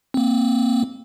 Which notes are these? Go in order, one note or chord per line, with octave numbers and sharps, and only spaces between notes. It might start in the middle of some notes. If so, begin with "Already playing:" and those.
A#3 C4